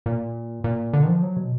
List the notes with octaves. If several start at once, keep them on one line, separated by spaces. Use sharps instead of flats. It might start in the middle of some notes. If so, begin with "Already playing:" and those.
A#2
A#2
D3
D#3
F3
F#3
B2